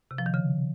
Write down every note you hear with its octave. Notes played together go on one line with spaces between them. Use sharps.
C3
F3
D#3
C#3